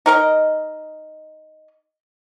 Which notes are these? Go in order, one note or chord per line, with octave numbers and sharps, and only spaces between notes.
D#4 A#4 D#5